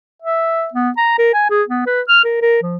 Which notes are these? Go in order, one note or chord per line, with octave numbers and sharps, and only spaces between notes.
E5
B3
A#5
A#4
G#5
G#4
B3
B4
F6
A#4
A#4
F3